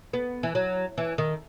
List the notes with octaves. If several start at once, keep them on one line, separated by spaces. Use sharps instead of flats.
B3
E3
F#3
E3
D#3